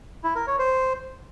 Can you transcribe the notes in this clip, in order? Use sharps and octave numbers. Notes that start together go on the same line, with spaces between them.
E4
A#4
C#5
C5